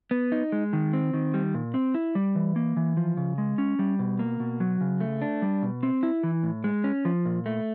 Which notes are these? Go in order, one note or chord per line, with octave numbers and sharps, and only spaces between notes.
B3
D#4
G#3
D#3
C4
D#3
G3
A#2
C4
E4
G3
E3
A#3
E3
F3
C#3
G#3
C#4
G3
B2
A#3
B2
F#3
C#3
A3
D4
G3
B2
C4
E4
E3
A2
G#3
C#4
F3
A#2
A3